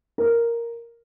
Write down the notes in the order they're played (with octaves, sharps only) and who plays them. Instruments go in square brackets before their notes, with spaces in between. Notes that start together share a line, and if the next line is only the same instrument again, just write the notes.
[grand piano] A#4